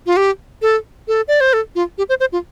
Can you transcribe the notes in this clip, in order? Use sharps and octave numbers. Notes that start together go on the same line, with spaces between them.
F4
G4
A4
A4
D5
C5
A4
F4
G4
C5
C5
F4